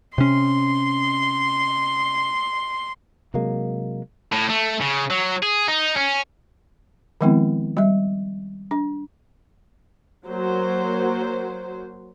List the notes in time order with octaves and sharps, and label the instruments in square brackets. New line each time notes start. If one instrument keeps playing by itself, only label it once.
[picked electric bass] C3 C#4 [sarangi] C6
[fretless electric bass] C3 F#3 G#3 A#3
[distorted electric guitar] A2
A3
C#3
F#3
G#4
D#4
C#4
[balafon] D#3 F3 G#3 B3 C4 E4
G3 E5
D4
[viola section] F#3 A#3 C5